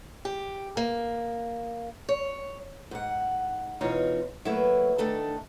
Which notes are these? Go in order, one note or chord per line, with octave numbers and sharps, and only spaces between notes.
G4
A#3
C#5
G#2 F#5
B2 E3 C#4 D#4 F4 C#5
F#3 A3 A#3 E4 B4
D#3 A3 D4 A4